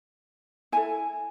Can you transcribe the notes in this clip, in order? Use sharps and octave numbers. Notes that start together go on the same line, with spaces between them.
E4 A4 G#5